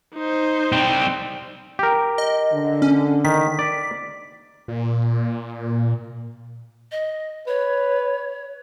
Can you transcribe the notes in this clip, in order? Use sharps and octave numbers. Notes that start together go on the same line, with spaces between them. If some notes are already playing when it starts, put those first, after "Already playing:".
D#4 C5
G3 C4
G4 A#4
D#5
D3
C#4
D#3 B6
D5
A#2
D#5
B4 C#5